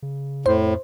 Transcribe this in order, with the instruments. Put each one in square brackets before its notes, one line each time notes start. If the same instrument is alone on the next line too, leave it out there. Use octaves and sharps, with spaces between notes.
[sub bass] C#3
[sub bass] F2 [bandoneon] A2 [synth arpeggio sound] C5